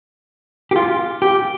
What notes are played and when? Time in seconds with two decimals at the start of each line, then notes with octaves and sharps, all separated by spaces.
0.71 G4
0.76 F4
1.22 G4